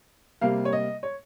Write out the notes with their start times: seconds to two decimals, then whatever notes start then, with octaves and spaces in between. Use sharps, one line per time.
0.41 C3 G3 A#3 F5
0.65 C#5
0.73 D#5
1.03 C#5